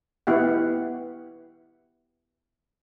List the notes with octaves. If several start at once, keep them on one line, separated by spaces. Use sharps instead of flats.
B3 E4 G4 F#5